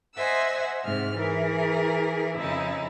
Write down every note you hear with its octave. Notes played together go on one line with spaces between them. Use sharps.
C5 D#5 E5 F#5 G#5 E6
G#2 C3 G#3 F6
E3 G#4 A#4
F2 C#3 D#4 E4